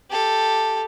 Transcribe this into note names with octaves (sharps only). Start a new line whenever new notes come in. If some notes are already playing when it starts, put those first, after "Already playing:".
G4 A4